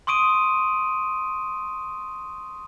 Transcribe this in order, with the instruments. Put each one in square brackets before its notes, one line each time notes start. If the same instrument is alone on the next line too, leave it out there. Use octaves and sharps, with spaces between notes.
[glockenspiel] C6 C#6 D#6 D7 D#7